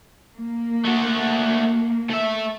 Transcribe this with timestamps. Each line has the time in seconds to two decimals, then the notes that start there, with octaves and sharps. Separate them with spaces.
0.36 A#3
0.85 A3 F#4
2.10 A3 E5